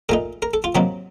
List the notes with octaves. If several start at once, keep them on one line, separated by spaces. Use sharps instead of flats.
A#2 A3 D#4 A#4
A#4
A4
F4
C3 F#3 A#3 D#4 F#4